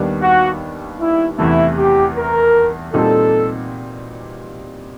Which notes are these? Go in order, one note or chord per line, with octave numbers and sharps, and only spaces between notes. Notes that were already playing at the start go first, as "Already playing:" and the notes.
Already playing: D#2 D#3 G3 B3 D4
F#4
E4
E2 C3 E3 A3 E4
G4
A#4
A#2 G3 C4 D#4 F#4 A4